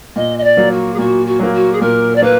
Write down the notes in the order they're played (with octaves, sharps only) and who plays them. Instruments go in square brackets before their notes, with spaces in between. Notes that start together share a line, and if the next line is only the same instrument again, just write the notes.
[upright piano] A#2 [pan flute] D#5
[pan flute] D#5
D5
[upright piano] F#3 A#3
[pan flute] F#4
G#4
[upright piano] A#2 [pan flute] F#4
[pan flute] F#4
[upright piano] F#3 A#3
[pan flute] F#4
G#4
[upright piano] A#2 [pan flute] A#4
[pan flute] D5
[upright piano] A#3 [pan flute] B4